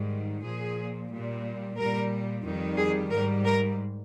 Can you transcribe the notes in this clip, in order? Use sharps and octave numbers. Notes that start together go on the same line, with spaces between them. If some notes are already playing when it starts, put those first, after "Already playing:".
Already playing: G#2 D#3 G3
A#2 F3 G#4
A#2 G3
A#2 G3 A#4
F2 D#3 G3
G#4
G#2 G3 A#4
A#4